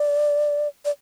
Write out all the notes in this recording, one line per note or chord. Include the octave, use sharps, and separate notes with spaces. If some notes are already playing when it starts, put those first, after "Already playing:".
Already playing: D5
D5